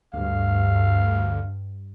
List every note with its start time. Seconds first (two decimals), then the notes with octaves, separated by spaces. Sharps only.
0.14 D2 G2 F5